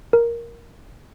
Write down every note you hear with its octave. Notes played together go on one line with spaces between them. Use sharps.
A#4